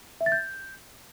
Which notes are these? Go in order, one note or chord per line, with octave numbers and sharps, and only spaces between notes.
E5
A6
G6